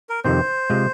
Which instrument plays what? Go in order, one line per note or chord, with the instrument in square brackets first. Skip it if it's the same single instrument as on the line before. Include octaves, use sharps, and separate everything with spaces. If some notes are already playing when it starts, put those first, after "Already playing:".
[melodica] A#4
[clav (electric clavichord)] F2 C3 D#3 C4 [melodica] C5
[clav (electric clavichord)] C3 G#3 F4 G#4